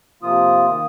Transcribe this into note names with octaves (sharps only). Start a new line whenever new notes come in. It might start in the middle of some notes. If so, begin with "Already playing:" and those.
C3 F3 A#3 F4 D#6
D#3 A#3